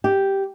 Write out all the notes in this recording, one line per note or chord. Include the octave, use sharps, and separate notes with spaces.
G4